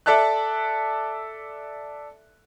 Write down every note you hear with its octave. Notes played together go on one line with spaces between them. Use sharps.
A4 D5 E5 A5 F#6